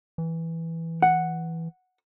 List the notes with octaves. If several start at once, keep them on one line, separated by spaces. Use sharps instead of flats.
E3
F#5